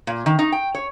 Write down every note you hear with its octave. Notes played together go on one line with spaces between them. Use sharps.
A#2
D#3
D#4
G5
C#5